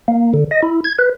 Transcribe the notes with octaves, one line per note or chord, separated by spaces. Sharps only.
A#3
D3
D#5
E4
G#6
B4